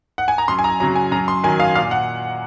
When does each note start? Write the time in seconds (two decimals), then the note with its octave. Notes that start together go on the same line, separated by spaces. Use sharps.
0.18 F#5
0.28 G#5
0.38 A#5
0.48 F#2 C6
0.59 G#5
0.64 A#5
0.80 F#3 A#5
0.83 C#3
0.96 G#5
1.11 F#2 A#5
1.28 C6
1.44 D#3 F#3 G#5
1.60 F5
1.76 A#2 F5
1.91 F#5